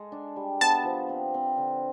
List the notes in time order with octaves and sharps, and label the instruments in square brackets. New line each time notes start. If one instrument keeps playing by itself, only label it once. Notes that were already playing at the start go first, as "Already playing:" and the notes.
Already playing: [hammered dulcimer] G#3 A4
D4
G3
[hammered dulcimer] B3 [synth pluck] A5
[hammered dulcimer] F3
C4
C4
D3